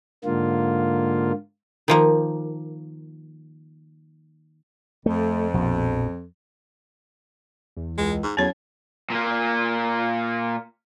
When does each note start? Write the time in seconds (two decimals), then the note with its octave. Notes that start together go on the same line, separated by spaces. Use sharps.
0.25 G#2 D3 A#3 F4
1.88 D#3 F3 A#3
5.06 F2 F3 A3
5.54 A#1 B2
7.77 E2
7.98 C#2 G#3
8.23 G#2
8.37 E2 A2 F#3 C#4 C#5 G#6
9.10 A#2 A#3